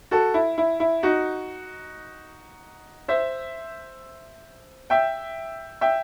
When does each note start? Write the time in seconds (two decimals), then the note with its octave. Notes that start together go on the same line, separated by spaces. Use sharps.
0.11 F#4 A4
0.34 E4
0.58 E4
0.80 E4
1.03 D#4 F#4
3.08 C5 E5
4.90 E5 G5
5.81 E5 G5